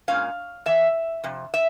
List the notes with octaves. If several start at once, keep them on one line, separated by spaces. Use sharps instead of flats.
A#2 G#3 C#4 F5
E2 E3 E5
F2 C3
E5